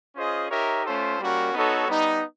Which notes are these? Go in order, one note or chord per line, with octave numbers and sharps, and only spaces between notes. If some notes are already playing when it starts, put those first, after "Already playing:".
C#4 F4 G#4 C5 D#5
D#4 G4 A#4 C#5 E5
A3 C#4 F4 A4 C5
G3 A#3 C#4 F#4 A#4
B3 D#4 F#4 A4 C#5
G3 B3 D#4